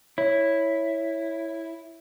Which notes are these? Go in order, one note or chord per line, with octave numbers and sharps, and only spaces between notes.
E4 C#5